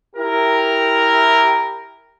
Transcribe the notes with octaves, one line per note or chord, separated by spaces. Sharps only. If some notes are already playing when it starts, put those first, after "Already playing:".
E4 G4 A#4